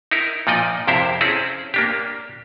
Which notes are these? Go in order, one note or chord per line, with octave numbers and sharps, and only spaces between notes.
D#4 E4 A#4
A#2 F3 D#4 D5 D#5
F2 C3 E4 A#4 C5 E5
C4 C#4 E4 G#4 A4
A#3 D4 G4